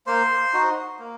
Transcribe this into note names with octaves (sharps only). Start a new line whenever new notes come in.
A#3 C5 C6
D#4 F#4
A#3